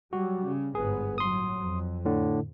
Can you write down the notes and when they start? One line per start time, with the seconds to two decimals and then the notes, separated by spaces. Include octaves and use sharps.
0.13 F#3 G3 F#4
0.45 C#3
0.75 G1 G#2 B3 G#4
1.18 A2 F#3 C6 D#6
1.62 F2
2.05 A2 D3